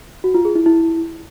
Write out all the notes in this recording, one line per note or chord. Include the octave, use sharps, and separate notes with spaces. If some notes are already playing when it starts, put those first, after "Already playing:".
F#4
F4
G#4
E4
E4